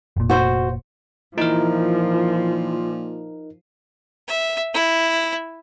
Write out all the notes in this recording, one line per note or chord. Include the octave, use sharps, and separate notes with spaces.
F1 A#2
F#4 C5
A#2 E3 F3 D#4 E4 A#4
E5
E4